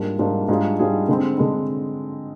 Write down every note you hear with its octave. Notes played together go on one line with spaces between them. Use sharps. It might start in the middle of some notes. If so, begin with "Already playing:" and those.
Already playing: G#2 G3 A#3 D4 F4
G#2 G3 A#3 D4 F4
G#2 G3 D4 F4 G#4
G#2 G3 D4 F4 G#4
D3 G#3 C4
D3 G#3 C4